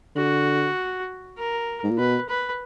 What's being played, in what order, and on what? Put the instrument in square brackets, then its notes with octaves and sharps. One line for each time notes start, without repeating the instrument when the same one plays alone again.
[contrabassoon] D3 [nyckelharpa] F#4
[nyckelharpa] A#4
[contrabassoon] G#2
A#2
[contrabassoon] B2 [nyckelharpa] B4
[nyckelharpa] B4